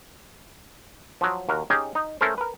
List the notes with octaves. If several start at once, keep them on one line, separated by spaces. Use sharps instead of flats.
F3 F#3
D#2 F#4 A#4
C#4 D#4 G4 G#4
D#4
A3 C#4 A4 A#4 C5
A#4 B4